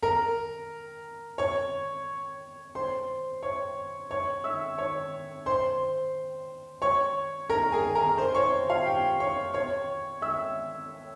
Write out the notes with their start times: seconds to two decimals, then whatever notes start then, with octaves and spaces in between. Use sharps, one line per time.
0.03 A#4 A#5
1.38 C#5 C#6
2.75 C5 C6
3.43 C#5 C#6
4.11 C#5 C#6
4.44 E5 E6
4.78 C#5 C#6
5.46 C5 C6
6.82 C#5 C#6
7.50 A#4 A#5
7.72 G#4 G#5
7.95 A#4 A#5
8.18 C5 C6
8.34 C#5 C#6
8.70 F4 F5
8.85 G4 G5
9.20 C#5 C#6
9.54 C#5 C#6
10.22 E5 E6